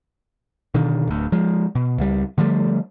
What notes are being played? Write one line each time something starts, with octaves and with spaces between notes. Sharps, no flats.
B2 D3 D#3
D1 D2
F3 G#3
B2
C#2 G3
D3 F3 G3 A3